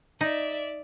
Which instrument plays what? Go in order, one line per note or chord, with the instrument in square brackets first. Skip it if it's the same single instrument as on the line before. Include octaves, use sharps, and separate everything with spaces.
[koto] D#4 [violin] D5 E5